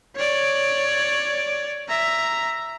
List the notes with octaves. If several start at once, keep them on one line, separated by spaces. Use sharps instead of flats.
C#5 D5
E5 A#5